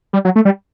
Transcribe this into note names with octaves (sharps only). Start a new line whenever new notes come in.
G3
F#3
A3
G3